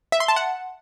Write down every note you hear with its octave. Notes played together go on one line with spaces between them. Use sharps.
E5
C6
A5
F#5